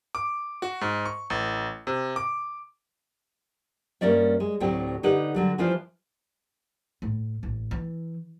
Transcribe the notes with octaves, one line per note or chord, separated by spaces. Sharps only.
D6
F#4
G#2
C#6
A1
C3
D6
G2 G3 A#3 C#4 D5 E5
G#3
D2 A2 F#3 C4 G4
D3 D#4 G4 B4 F#5
D3 F#3 G3
E3 F3 E4 F4 C5 D5
A2
A1
E3